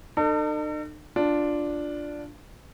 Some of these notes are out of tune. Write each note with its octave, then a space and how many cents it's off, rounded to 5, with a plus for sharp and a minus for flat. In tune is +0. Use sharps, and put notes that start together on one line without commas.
D#4 -45 A4 +40
D4 +0 F4 +0